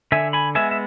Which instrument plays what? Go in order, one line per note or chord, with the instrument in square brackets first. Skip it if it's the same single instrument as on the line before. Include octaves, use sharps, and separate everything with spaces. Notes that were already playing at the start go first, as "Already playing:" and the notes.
[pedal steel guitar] D3 E5 G#5
G#5 B5
G#3 B3 E5 G#5
E5